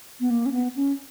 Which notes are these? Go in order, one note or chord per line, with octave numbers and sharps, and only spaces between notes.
B3
A#3
C#4
B3
C#4